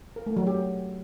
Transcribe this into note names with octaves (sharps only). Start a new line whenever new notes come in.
A#4
A3
F#3
G4